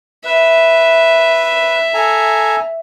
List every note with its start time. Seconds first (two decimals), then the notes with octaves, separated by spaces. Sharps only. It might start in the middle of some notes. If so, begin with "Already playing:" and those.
0.25 B4 E5
1.94 A4 G#5 A#5